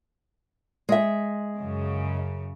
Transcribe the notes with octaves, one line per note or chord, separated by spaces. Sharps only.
G#3 E5
F#2 C#3